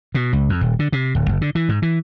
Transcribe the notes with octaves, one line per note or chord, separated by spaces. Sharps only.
B2
C#2
F2
D#1
D3
C3
D1
F#1
D3
E3
G#2
E3